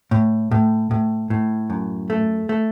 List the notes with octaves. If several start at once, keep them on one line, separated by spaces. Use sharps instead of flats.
A2
A2
A2
A2
F#2
A3
A3